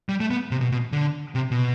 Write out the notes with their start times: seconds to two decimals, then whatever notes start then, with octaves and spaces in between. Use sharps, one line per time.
0.09 G3
0.20 A3
0.31 B3
0.51 C3
0.61 B2
0.71 B2
0.92 D3
1.35 C3
1.51 B2